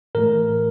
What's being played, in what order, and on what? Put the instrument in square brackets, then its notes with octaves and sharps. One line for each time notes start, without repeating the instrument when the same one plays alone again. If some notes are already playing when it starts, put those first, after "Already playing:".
[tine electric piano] A2 E3 A3 A#4